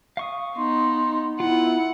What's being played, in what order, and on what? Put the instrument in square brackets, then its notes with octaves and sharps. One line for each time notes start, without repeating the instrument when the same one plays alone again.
[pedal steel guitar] F5 C#6 D#6
[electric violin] B3 D#4 [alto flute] C6
[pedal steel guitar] B3 F4 [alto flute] E4 [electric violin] F#5